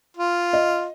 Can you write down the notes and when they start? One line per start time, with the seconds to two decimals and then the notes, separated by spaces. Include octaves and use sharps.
0.17 F4
0.53 D#5